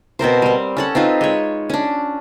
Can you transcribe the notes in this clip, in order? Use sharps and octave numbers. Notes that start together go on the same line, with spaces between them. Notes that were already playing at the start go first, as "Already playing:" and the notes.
B2 C4 A#4 C5
G3 C4
C#4 A4 F#5
C4 D#4 F4 B4
G#3 C#5
C#4 D4